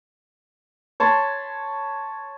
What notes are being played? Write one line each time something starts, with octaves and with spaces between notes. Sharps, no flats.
C#5 A5 B5 C6